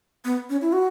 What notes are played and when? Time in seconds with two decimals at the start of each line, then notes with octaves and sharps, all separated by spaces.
0.25 B3
0.50 C#4
0.62 E4
0.73 F#4